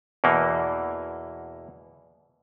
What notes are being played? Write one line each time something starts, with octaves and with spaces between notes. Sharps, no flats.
E2 B2 E3 A#3